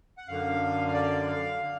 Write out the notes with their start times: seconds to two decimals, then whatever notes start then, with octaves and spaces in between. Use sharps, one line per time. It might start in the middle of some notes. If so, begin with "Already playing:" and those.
0.18 F#5
0.28 F#2 D3 F5
0.88 F5
0.93 D5
1.27 F5
1.60 D3